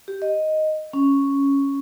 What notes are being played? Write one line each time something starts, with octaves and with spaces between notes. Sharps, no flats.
G4
D#5
C#4